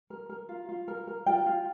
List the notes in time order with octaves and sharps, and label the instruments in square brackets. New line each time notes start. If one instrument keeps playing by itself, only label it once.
[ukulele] A#4
A#4
F4
F4
A#4
A#4
F4 G5
F4